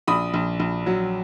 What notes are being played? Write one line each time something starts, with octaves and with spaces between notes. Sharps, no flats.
A#1 B5 D#6
A#1
A#1
F#3